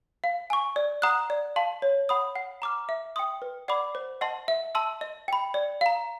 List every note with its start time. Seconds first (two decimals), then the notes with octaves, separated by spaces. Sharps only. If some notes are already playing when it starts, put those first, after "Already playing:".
0.24 F5
0.50 G#5 C#6
0.76 D5
1.02 F#5 A#5 D#6 F#6
1.30 D5
1.56 F5 A5 C6
1.82 C#5
2.09 F#5 B5 D#6
2.35 F#5
2.62 A#5 D6 F6
2.89 E5
3.16 G5 C6 D#6
3.42 B4
3.68 D5 F#5 B5 D6
3.95 C5
4.21 D#5 F#5 A5 C6
4.48 E5
4.75 A5 C6 E6
5.01 D#5
5.28 G5 B5
5.54 D5
5.81 F5 A#5